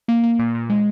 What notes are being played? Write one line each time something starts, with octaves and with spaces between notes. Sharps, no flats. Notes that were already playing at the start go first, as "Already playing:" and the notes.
A#3
A#3
A#2
A#2
G#3